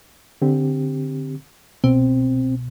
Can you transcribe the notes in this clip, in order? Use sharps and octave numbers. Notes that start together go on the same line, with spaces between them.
D3 C4 G4
C2 B2 C4